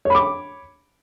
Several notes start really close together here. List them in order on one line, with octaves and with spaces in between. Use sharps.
C#5 B5 D6